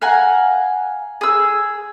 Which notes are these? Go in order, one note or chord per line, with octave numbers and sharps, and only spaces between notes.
F5 F#5 G#5 A#5
G#4 E6